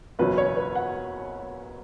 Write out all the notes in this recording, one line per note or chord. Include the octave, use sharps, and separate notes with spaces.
F#1 E2 B2 F#3 C#4 B4
C#5
B4
F#5